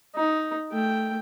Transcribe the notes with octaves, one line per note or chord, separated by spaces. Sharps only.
D#4
A3 G5